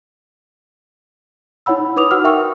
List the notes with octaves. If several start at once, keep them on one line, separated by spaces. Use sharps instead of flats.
D#4 E4 C#5 F#5 B5 E6
D#4 B4 D6 D#6 F7
F#4 F#5 E6 F6
A#4 E5 F#5 G5 C#6 E6